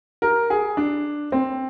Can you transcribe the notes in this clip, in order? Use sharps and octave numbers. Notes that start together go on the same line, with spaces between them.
A#4
G#4
D4
C4